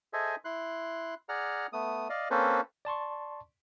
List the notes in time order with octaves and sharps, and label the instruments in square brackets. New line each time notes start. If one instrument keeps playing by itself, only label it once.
[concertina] G#4 A4 C5 D#5 E5 G#5
E4 C6 F#6
G#4 D5 F#5 A#5 F6
A3 B3 D#6
D5 D#5 F5
A#3 C4 C#4 A4 B4 C5
[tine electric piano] D5 A5 C6 C#6